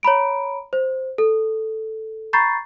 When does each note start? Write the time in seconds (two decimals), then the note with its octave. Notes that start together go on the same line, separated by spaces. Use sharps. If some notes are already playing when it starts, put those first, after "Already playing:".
0.03 C#5 A#5 B5 D7
0.73 C5
1.18 A4
2.33 A#5 B5 C#6 G6 A6 C7